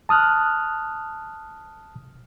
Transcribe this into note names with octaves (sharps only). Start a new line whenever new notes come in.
A5 D#6 F6 F#6